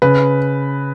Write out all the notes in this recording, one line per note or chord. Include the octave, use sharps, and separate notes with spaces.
C#3 B4